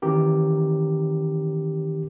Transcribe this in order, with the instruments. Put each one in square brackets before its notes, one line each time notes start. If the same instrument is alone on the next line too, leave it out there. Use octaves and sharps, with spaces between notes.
[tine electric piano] D#3 E3 C#4 G4 A#4